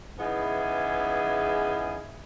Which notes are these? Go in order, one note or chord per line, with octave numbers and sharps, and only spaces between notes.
C#3 E3 B3 D#4 E4 G#4